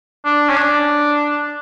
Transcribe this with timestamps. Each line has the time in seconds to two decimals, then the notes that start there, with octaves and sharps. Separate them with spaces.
0.25 D4
0.50 C#4
0.57 D4